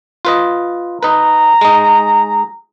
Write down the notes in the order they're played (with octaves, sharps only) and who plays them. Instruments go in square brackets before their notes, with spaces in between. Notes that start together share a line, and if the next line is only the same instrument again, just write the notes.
[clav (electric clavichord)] F4 B4 D#5
[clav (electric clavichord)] D#4 B4 [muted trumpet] A#5
[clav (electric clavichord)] G#3 D#4